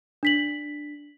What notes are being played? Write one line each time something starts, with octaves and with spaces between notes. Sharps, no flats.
D4 B6 F#7